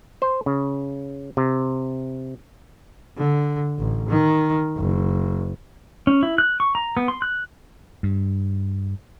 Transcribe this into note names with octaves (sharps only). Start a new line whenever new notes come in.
C5
C#3
C3
D3
A1
D#3
F#1
C#4
E4
F#6
C#6
A#5
B3
C6
F#6
G2